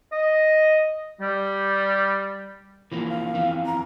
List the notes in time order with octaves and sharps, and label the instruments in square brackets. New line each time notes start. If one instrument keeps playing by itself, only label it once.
[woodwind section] D#5
G3
[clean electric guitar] E3 F3 A#3 [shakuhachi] A#4
[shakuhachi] F5
[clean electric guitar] F2 E3
[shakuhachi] A#5